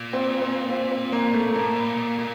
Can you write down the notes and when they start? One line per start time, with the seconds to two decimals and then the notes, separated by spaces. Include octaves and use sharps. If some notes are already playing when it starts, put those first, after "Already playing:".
Already playing: A#2
0.13 C4
0.42 C4
0.70 C4
0.91 C4
1.12 A#3
1.34 A3
1.54 A2 A#3
1.76 A#2
1.97 A#2
2.19 A#2